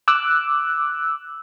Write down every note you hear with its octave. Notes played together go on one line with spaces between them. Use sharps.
D6 E6 F#6